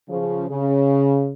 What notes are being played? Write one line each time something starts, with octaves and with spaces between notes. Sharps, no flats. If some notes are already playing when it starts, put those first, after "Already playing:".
C#3 F3
C#3